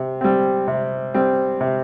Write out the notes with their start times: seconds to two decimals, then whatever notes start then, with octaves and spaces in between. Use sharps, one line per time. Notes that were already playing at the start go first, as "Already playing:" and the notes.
Already playing: C3
0.21 G3 C4
0.68 C3
1.14 G3 C4
1.61 C3